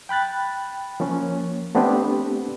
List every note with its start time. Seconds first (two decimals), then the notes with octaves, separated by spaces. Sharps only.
0.09 G5 B5 F#6 A6
1.00 F3 A#3 C#4
1.75 A3 B3 C4 D4 G4 B4